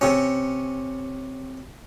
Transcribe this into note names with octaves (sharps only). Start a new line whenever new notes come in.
C3 C#4